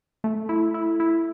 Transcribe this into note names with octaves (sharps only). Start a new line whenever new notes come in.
A3
E4
E4
E4